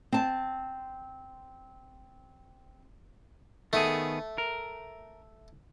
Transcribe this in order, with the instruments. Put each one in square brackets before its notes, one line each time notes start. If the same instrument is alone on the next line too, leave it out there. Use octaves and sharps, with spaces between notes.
[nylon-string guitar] C4 A5
[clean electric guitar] D#3 B3 G#4 [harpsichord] A3
[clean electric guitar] A#4